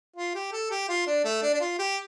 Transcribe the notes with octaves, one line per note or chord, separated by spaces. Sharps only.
F4
G4
A4
G4
F4
D4
A3
D4
D4
F4
G4